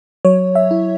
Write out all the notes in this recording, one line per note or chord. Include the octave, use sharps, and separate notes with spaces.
F#3 C#5
E5
E4